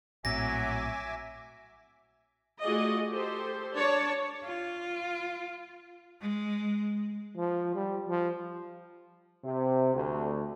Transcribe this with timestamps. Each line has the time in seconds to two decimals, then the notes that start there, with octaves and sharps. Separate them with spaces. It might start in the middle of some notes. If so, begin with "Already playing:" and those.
0.25 A#1 A2 F#3 C4 E5 G#5 D6 A#6
2.61 A3 F4 F#4 G#4 D5 D#5
3.09 G4 A4 C5
3.75 D4 C#5 D5 A5
4.44 F4
6.22 G#3
7.37 F3
7.75 G3
8.09 F3
9.44 C3
9.94 D2